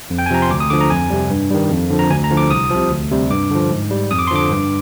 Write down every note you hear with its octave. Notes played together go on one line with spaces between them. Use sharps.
F2
G5
G#5
C3 F3 A#5
C6
D2 D6
D#6
D3 F3 D6
A#5
F2 G#5
C3 G3
G2
D#3 G3
F2
D3 F3
A#5
D2 G#5
A#5
D3 F3
D6
C2 D#6
C3 F3
D2
C3 G3
G2 D6
D3 F3
G#2
G3
F2 D#6
D6
C6
D3 F3 D6
G2